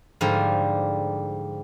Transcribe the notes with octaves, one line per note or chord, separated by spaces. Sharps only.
G#2 D3 F3 G3